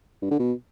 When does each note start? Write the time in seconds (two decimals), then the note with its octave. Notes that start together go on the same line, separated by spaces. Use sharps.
0.22 G2
0.30 D3
0.39 B2